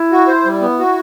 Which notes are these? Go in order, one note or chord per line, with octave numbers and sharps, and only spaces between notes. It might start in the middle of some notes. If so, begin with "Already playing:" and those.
Already playing: E4
F#4
C5
G3
B3
F#4